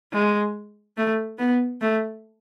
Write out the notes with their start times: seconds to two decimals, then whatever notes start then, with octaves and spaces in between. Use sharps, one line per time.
0.13 G#3
0.97 A3
1.39 B3
1.81 A3